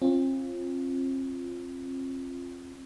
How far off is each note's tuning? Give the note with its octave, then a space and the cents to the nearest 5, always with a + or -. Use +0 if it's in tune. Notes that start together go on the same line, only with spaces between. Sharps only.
C4 +40 F4 +0